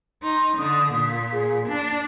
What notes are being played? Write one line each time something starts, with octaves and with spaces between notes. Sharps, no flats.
D#4 C6
D3 D#6
A#2
G#4
D4 A5